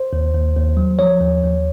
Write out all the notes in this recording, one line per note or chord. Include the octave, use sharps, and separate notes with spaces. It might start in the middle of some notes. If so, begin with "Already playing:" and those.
Already playing: C5
D#2
D#2
D#2
F#3
F3 C#5
D#2
D#2